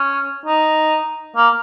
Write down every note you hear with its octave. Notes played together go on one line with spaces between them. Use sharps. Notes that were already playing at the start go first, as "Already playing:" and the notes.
Already playing: C#4
D#4
A#3